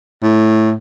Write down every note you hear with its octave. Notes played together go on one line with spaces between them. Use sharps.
A2